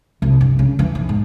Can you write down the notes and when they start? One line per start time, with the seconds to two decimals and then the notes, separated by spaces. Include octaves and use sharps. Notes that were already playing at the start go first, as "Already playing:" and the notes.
0.22 C2
0.41 G2
0.59 C#3
0.79 E3
0.95 B1
1.09 G#2